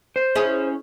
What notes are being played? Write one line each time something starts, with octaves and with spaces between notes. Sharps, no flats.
C5
C#4 E4 G#4